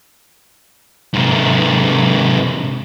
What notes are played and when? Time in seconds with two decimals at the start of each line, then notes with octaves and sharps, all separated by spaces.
1.14 G#2 C3